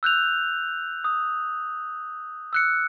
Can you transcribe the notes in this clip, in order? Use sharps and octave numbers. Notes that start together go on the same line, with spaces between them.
E6 F#6 G6 F7
D#6
E6 F#6 C#7